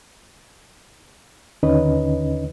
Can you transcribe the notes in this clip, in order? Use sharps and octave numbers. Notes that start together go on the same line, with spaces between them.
D#2 D3 C#4 D#4 B4 D#5